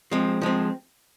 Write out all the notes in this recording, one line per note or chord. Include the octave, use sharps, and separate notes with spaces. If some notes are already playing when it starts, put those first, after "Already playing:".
F3 G#3 C4
F3 G#3 C4